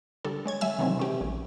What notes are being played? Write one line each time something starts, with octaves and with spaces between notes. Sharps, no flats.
D3 G3 D4 A4
G#3 C#5 G#6
G3 E5 G#5 E6
C3 D#3 E3 F#3 G#3 C4
B2 C#4 G4
A#1